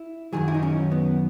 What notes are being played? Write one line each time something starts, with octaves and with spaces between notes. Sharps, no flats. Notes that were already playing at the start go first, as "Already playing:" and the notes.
Already playing: E4
F#2 D#3 F#3 G#4
E4
D#4
C#4
B3